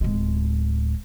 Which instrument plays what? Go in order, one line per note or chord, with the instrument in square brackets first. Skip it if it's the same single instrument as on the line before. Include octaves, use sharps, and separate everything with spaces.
[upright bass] D1 G#3